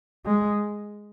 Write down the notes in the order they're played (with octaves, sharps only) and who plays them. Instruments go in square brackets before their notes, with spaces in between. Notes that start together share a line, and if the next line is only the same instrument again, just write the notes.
[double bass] G#3